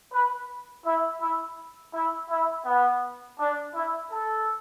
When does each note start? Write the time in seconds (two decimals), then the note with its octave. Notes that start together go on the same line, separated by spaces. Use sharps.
0.12 B4
0.85 E4
1.21 E4
1.94 E4
2.30 E4
2.66 B3
3.39 D4
3.75 E4
4.11 A4